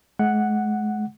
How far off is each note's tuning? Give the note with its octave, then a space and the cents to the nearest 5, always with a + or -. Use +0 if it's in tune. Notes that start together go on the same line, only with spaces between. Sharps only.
G#3 +40 F#5 +0